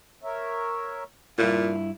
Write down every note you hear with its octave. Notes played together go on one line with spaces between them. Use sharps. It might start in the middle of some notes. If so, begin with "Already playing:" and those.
A#4 C#5 E5
G2 A#2 E4 F4 F5